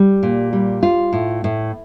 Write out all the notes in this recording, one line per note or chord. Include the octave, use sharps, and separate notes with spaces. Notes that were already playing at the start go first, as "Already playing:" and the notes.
Already playing: G3
A#2
G3
F4
A2
A2